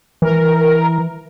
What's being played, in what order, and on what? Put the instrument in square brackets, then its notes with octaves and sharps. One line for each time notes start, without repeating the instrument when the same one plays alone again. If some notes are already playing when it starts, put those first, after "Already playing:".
[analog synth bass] E3 [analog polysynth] A#4